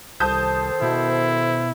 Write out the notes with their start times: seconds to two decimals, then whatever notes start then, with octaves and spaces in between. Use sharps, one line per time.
0.20 C2 D#3 A4 C5 A5 D#6 G6
0.82 B2 E4